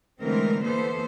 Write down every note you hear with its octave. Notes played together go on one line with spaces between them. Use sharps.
D3 E3 G#3 A3 C4 A#4
E3 A#3 B3 A4 C5